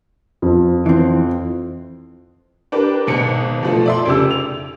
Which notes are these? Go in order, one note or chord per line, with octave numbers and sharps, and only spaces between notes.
F2
E3 C4
D4 G4 A#4 B4
G#1 B2 C#7
B2 F3 A3
D5 E5 C6
F1 C#3 G4 E6
F7